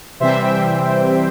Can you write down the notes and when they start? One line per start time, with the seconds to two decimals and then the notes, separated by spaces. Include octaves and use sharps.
0.20 C3 E3 G3 C4 C5 E5
0.42 E5 G5